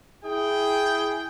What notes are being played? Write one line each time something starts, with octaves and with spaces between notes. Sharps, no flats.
E4 G#4 G5